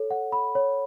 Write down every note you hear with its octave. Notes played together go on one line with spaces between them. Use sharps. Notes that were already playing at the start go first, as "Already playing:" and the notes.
Already playing: A4 C#5
F#5
B5
C#5